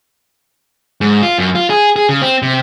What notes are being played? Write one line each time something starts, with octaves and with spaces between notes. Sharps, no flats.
G#2
F4
F#2
F4
G#4
G#4
C#3
C4
C3